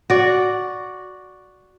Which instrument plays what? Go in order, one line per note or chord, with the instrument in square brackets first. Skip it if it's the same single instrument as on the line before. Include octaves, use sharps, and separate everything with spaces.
[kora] F#4 D5